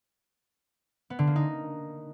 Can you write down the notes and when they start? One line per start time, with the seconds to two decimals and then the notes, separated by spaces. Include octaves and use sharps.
1.10 B3
1.19 D3
1.27 A#3
1.36 D#4